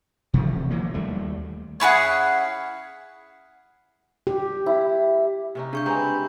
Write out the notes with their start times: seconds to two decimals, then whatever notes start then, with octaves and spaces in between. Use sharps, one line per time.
0.34 C3 E3 F3 A3
0.70 E3 F#3 A#3
0.94 D#2 G3 A3
1.80 C#4 E4 G#4 F#5
4.27 G4
4.66 E4
5.55 C3 C#4 D#4
5.73 C#3 D4 C#6 G6
5.86 G#3 C4 G4 B4 G#5 A#5
5.98 B5